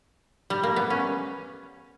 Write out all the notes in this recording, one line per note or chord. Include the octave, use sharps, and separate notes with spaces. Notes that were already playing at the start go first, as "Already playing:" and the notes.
G3
A#3
B3
C#4